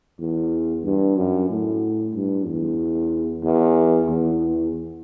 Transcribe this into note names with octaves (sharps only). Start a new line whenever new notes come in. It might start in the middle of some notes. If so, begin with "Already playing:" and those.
E2
G2
F#2
A2
G2
E2
E2
E2